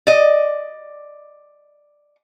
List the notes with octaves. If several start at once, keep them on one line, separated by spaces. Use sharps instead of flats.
D5 D#5